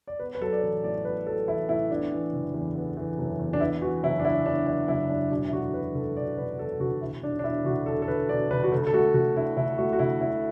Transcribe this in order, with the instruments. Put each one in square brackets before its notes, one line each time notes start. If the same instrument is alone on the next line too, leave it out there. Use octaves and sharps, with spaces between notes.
[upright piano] D5
B3 B4
B4
F#3 A4
D5
A1 B4
A2 D5
B3 B4
F#3 A4
A1 E4
A2 E4
B3 D4
E3
F#1
E2
B3
E3
F#1
E2
D4
B3 E4
E3 F#4
F#1 E4
D4
F#2 E4
B3 D4
E3 E4
F#1 E4
F#2 D4
E1 D4
E4
D3 F#4
E1 B4
D2 A4
E1 D5
D3 B4
E1 A4
D2 F#4
E1 E4
D3 D4
D4
E1 E4
D2 F#4
E1 A4
A4
D3 B4
E1 D5
D2 B4
F#4
D2 A4
A4
A3 F#4
D2 F#4
D3 E4
D2 E4
A3 F#4
F#4
D2 E4
D3 E4